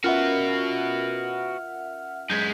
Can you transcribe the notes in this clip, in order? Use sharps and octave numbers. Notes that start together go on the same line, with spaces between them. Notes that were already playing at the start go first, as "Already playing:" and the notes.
C#4 F4 F#4 A#4 B4 E5 F#5 F6
F#2 G#3 G6 G#6 B6